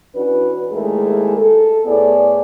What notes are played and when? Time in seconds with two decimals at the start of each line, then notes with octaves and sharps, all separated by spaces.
0.15 E3 C#4 D4 F#4 B4
0.72 D#2 G#3 A3 E4 G#4 A#4
1.38 A4
1.85 A2 B3 E4 G#4 D5